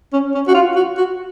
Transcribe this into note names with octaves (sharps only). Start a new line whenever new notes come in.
C#4
C#4
F#4
F4
F#4
F#4